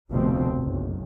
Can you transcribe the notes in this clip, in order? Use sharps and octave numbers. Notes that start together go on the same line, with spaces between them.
F1 D2 B2 F3 C4
F#1 B1